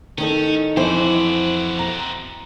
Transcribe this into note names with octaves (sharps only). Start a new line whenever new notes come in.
D#3 C#4 D#4 A4
F2 E3 C4 F#4 C5
A#5